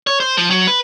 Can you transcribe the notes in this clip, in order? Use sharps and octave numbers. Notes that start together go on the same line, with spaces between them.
C#5
C5
F3
F#3
B4